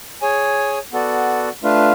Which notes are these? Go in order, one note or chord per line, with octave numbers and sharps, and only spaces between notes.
G#4 C#5 G#5
B3 F#4 A4 D5 F#5
A3 D4 F4 B4 F5